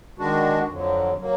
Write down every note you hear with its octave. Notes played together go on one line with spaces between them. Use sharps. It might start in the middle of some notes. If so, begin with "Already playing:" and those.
D#3 G#3 D4 F#4
F2 D3 F#3
F#3 A#3